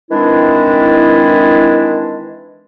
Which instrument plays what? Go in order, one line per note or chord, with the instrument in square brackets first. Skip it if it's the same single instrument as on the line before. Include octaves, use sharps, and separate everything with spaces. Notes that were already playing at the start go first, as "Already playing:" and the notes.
[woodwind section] D#3 E3 G#3 C4 D4 E4